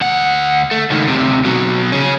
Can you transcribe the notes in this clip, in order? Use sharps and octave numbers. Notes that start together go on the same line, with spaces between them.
D2 F#5
A3
C#2 D#3
D2 C3
B2 F#3
C#3 C#4